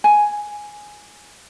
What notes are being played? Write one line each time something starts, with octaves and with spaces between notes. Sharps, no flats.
G#5